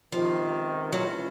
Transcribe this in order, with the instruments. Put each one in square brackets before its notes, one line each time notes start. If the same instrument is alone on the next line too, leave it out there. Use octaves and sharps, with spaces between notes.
[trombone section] C#2 C3 D#3 [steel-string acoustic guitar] F3
[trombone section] E3 G#3 C#4 F4 [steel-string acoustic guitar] F#3